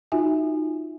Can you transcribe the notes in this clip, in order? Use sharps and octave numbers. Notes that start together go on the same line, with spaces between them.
D#4 F4 F#4 E5 G#5